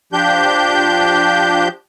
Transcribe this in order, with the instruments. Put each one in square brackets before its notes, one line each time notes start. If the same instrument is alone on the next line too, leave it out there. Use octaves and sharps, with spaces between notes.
[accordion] F3 D4 G4 G6